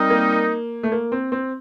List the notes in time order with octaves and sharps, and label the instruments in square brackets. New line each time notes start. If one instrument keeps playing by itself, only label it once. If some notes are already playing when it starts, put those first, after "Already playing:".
Already playing: [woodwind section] G3 C4 D#4 A#4
[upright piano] A#3
A3
A#3
C4
C4